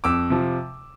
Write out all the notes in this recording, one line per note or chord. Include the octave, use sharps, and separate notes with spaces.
F2 D6 E6
C3 F3